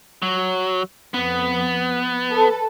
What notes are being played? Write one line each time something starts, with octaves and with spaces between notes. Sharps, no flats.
F#3
F2 B3
A4 B4